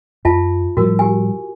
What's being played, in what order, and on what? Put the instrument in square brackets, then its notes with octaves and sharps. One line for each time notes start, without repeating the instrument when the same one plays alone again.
[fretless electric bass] F#2 [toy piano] F4 E5 A5
[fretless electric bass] A2 F3 G3 [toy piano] F#4 A#4
[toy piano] G4 G#5